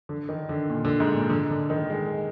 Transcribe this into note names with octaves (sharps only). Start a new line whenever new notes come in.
D3
D#3
D3
A#2
D3
G#2
A#2
D3
D3
D#3
G#3